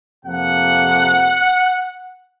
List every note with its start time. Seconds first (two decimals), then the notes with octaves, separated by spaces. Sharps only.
0.24 F2 C3 F3 A#3 F#5